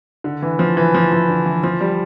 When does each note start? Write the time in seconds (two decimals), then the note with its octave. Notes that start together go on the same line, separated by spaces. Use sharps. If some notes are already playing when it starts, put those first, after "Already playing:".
0.24 D3
0.42 E3
0.59 F3
0.77 E3
0.94 F3
1.12 E3
1.28 D3
1.46 E3
1.64 F3
1.81 G3